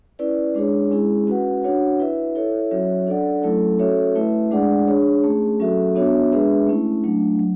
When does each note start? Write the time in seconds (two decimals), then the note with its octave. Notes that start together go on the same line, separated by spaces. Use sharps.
0.19 C#4 E4 B4 D5
0.55 G#3 D4 G#4 C#5
0.91 G#3 C#4 E4 G#4
1.27 C#4 F#4 B4 F#5
1.63 D4 F#4 C#5 F#5
1.99 E4 B4 E5
2.35 E4 A4 C#5 E5
2.71 F#3 C#4 F#4 C#5 E5
3.07 D4 A4 D5 F#5
3.43 F#3 A3 C#4 E4 A4
3.79 C#4 F#4 A4 C#5 E5
4.15 A3 E4 B4 E5
4.51 G#3 D4 G#4 D5 F#5
4.87 D4 G#4 C#5
5.24 A3 C#4 G#4
5.60 F#3 C#4 F#4 A4 E5
5.95 B3 D4 F#4 C#5 E5
6.32 G#3 D4 G#4 B4 E5
6.67 A3 C#4 E4
7.04 F#3 A3 D4
7.39 F#3